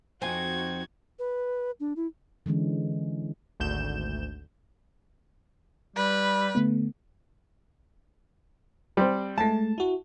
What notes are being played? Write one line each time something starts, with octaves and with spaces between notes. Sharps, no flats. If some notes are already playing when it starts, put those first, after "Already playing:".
F2 C4 D#4 F#4 G#5 G#6
B4
D4
E4
D3 E3 G#3 C#4
G#1 D2 G6 E7
G3 B4
D3 A3 B3
G3 C4
G#3 A3 A5
E4 F#4